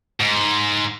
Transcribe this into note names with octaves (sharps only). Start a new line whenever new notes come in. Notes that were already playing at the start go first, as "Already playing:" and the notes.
G#2